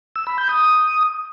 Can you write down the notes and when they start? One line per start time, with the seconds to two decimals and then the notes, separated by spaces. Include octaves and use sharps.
0.16 E6
0.27 B5
0.38 G6
0.49 D#6